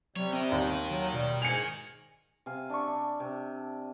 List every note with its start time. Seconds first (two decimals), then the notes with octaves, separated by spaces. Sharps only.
0.16 C3 F#3 G3 C#5
0.33 C4 A#4 D#5
0.52 D#2
0.91 D#3 F#3
1.14 B2 G3
1.42 G#2 G#5 C#7 F7
2.46 C3 F5 G#5
2.70 D4 D5 E5 C#6
2.88 D4
3.20 C3